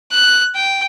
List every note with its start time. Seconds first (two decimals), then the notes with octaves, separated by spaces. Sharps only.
0.12 F#6
0.55 G5